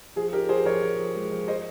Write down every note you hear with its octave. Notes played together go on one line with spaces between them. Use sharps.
F3 G#4
D#4 G4 A#4
F3 G#4 C5
F3 A#4 C#5
F3
F3
G#3
F3
C5 D#5